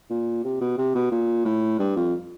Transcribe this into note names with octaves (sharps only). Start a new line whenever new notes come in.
A#2
C3
B2
C3
B2
A#2
A2
G2
F2